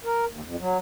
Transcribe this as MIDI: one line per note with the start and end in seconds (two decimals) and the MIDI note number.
0.04 0.25 70
0.30 0.41 39
0.43 0.56 41
0.59 0.78 54